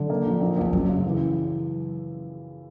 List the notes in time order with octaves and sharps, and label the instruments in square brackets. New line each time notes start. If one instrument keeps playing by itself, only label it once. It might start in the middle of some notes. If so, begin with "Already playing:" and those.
Already playing: [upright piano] D3 [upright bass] F#3
[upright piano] A#3
A#1
A#1
[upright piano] A#1 [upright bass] F3
[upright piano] F#2 [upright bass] F#3
[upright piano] C#3
E3